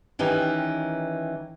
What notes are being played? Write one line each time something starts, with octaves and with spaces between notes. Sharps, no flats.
D#3 E3 C#4 D#4 G4